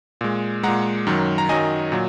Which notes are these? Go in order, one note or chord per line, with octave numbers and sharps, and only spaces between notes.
A#2 G#3
A#2 G#3 F#5 A#5
F#2 D#3 F#3
A#5
F#2 D#3 F#3 D#5 G#5
A#2 F#3